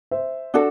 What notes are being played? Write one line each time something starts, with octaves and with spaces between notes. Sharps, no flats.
C5 E5
D4 F#4 A4 D5 F#5